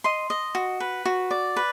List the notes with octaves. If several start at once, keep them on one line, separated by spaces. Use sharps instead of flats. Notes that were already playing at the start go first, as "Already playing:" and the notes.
D#5 C6
D#5
F#4
B4
F#4
D5
B4